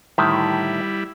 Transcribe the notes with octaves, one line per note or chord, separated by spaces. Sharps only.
A2 D3 D#3 G3 E4